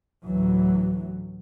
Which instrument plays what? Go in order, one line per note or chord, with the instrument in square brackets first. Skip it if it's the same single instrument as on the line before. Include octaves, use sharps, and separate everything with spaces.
[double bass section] A1 D2 E3 F#3